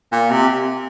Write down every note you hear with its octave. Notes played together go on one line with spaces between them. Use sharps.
A#2
C3